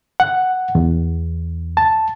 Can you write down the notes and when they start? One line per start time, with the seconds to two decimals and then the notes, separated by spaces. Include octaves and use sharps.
0.20 F#5
0.75 E2
1.77 A5